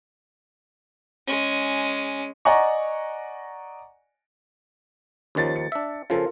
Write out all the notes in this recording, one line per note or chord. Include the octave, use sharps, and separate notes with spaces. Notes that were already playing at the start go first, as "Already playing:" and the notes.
G#3 C#4
D5 D#5 F#5 G#5 A#5 C#6
D#2 D#3 F3 C#4 A6
C#7
D4 E5
C#3 F3 F4 A4 A#4